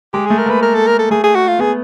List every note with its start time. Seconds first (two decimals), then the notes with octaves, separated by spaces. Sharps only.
0.13 G#3 G4
0.26 A3 G#4
0.38 A#4
0.46 A#3 B4
0.63 A#4
0.75 A4
0.87 A#4
0.99 A4
1.11 A3 G#4
1.23 G#4
1.35 F#4
1.48 F4
1.59 B3 G#4